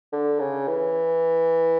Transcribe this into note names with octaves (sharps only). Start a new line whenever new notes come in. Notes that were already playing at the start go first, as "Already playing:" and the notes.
D3
C#3
E3